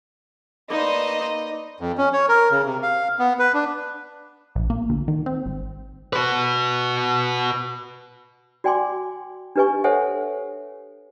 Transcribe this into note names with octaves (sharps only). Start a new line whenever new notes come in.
A#3 D#4 B4 C5 D5 D#5
F2
C#4
C#5
A#4
C#3
C3
F5
B3
B4
D4
A#1
A#3
D2
D#3
C4
G#1
F#4 B4
F#4 D5 G5 G#5 C6 D6
D4 G4 B4 D#5 G#5 C#6
A4 C5 C#5 E5 F#5 G#5